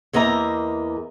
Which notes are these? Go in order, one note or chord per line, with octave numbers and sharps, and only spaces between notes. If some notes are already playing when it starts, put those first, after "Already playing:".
E2 A#3 D#5 E5 A#5